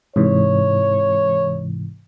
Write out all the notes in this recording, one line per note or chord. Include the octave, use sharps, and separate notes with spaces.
G#2 C3 E3 C#5